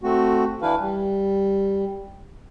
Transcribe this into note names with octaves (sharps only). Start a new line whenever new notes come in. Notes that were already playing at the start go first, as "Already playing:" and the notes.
A3 C4 F#4
E3 D4 E4 B4 F5
G3